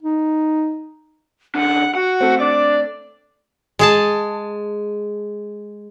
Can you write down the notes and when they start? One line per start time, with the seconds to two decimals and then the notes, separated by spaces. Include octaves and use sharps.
0.03 D#4
1.55 C#3 D4 F#5
1.95 F#4 F#5
2.20 A3 C4
2.40 D4 D5
3.79 G#3 G#4 A5